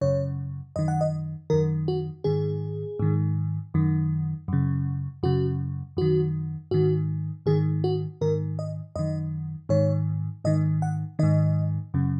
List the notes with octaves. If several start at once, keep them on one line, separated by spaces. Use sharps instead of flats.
F#2 C#3 C#5
F#2 D#3 D#5
F#5
D#5
F#2 D#3 A#4
F#4
G#2 D#3 G#4
G#2 D#3
F#2 D#3
F#2 C#3
F#2 C#3 F#4
F#2 D#3 F#4
G#2 D#3 F#4
G#2 D#3 G#4
F#4
G#2 D#3 A#4
D#5
F#2 D#3 D#5
G#2 D#3 C#5
G#2 D#3 D#5
F#5
G#2 D#3 D#5
F#2 C#3